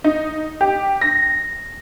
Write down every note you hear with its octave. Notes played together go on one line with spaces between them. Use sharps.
D#4
G4
A#6